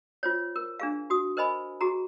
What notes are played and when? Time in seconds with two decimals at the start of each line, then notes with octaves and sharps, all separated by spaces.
0.23 F4 C5 C#5
0.56 A#4
0.80 D4 G#4 F5
1.10 F#4 D#6
1.37 A#4 C5 D#5 G#5 B5
1.81 F#4 G#4 A#5